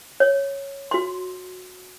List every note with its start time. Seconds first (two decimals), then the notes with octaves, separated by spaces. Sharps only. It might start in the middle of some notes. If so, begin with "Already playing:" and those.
0.20 C#5
0.91 F#4 C6